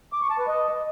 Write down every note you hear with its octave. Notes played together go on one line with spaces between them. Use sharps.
D6
C#6
A5
B4
D#5